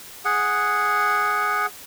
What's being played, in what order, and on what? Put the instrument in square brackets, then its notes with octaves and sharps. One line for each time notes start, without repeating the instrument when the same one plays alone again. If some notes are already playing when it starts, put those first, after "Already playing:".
[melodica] G#4 F#5